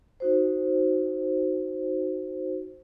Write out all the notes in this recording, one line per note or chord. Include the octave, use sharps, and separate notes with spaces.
D#4 F#4 C5